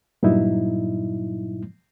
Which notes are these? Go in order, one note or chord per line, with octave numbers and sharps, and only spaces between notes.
G2 A#2 F#3 D#4 E4